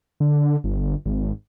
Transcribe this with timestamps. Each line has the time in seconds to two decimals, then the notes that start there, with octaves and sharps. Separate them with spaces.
0.20 D3
0.64 G1
1.06 G#1